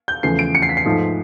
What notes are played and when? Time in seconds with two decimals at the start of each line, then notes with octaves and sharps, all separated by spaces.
0.08 G6
0.23 E2 C#3 F3 A3 C7
0.39 D7
0.55 C#7
0.62 C7
0.69 B6
0.77 C7
0.85 G#2 F3 A3